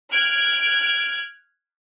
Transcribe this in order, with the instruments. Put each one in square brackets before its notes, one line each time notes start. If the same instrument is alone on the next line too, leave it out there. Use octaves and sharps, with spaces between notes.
[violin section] F6 F#6 G#6 D7